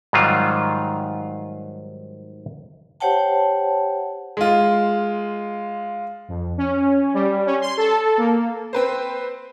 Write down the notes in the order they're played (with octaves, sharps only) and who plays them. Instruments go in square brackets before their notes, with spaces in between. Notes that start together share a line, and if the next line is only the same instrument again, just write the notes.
[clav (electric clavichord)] G#2 D#3 F#3 G3 F4
[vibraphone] G4 C5 C#5 F#5 G5 A5
[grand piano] G#3 F4
[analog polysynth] F2
C#4
G3
C#4
C6
A4
A#3
[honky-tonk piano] C4 B4 C5